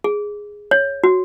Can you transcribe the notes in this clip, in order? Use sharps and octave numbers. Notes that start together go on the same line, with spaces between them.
G#4
C#5
F#4